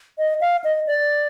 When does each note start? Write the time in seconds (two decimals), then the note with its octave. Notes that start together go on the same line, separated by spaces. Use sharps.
0.18 D#5
0.41 F5
0.64 D#5
0.87 D5